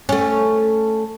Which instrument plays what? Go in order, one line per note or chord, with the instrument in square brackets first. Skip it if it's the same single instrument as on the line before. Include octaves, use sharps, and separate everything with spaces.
[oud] A3 C#4